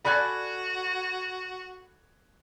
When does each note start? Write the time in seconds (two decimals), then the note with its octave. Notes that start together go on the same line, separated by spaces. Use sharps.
0.05 F#4 A4 D5 G#5 B5 F#6 G#6